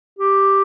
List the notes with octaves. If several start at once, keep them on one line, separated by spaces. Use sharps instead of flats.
G4